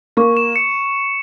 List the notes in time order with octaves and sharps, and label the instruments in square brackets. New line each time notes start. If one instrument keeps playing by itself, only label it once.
[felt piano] A#3 [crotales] C#6
[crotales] E7
C#7